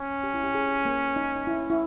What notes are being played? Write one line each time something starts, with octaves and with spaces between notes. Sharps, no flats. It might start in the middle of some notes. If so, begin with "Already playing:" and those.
Already playing: C#4
G4
E4
G4
G#4
A#3
D#4
D#4
E4
E4